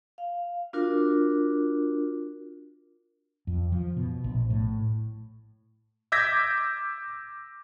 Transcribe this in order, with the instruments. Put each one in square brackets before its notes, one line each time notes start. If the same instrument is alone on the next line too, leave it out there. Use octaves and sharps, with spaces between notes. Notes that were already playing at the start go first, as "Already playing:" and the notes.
[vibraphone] F5
D4 F4 F#4 A#4
[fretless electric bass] F2
F3
B2
A#1
A2
[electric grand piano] D6 E6 G6 G#6 A#6 B6